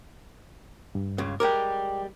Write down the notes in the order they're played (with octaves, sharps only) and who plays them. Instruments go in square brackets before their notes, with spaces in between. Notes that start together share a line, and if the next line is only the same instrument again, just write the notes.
[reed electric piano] G2
[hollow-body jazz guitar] C#2 C#3
[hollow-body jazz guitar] G3 G#3 A#4 [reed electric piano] G5 D6